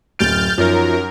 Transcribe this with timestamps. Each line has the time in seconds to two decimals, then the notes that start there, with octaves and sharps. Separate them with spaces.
0.19 D1 F#2 F6 G6 A6 D7
0.58 F#2 F3 C#4 D#4 A#4